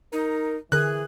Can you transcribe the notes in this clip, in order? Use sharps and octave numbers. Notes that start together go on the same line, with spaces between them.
D#4 A#4
D3 E3 G#4 A#4 F#6